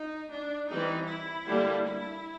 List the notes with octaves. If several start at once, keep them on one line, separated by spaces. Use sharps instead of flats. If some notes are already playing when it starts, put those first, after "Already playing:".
Already playing: D#4
D4
E3 G3 C4 D#4
E4
D3 G3 A#3 D4
E4